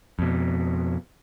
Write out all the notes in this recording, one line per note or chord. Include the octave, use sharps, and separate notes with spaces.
F2 B2